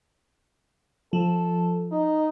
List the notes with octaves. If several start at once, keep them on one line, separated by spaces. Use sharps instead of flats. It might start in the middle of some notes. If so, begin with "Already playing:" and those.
F3 A4
D#4